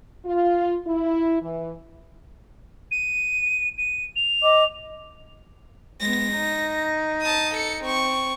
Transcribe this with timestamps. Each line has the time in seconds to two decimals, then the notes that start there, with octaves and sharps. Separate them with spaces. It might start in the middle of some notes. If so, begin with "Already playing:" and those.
0.24 F4
0.86 E4
1.41 E3
2.91 D#7
3.78 D#7
4.16 F7
4.42 D#5 D6
6.01 G#3 B3 A#6
6.32 D#4
7.22 A5 D#6
7.55 A4 C#7
7.84 C4 C#6